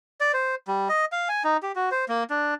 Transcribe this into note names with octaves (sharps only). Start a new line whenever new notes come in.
D5
C5
G3
D#5
F5
G#5
D#4
G4
F#4
C5
A#3
D4